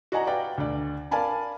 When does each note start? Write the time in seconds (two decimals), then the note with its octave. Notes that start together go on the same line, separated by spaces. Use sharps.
0.12 F#4 D5 D#5 F#5 G#5 A#5
0.27 B4 D5 F5 G5
0.58 D2 D5
1.11 A#4 D5 F5 G#5 A5 B5